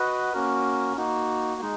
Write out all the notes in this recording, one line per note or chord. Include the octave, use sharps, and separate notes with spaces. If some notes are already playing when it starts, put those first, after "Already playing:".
Already playing: F#4 B4 D#5 F#5
A#3 C#4 F#4 A#4
A#3 D#4 F#4
G#3 D#4